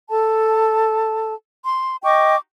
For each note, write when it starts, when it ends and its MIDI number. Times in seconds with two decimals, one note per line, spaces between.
0.09 1.34 69
0.09 1.34 81
1.64 1.98 84
2.03 2.36 75
2.03 2.36 79
2.03 2.36 85
2.03 2.36 86